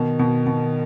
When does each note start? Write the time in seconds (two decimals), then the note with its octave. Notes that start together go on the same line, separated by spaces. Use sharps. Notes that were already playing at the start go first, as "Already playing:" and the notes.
Already playing: B2 D#3
0.19 B2
0.47 B2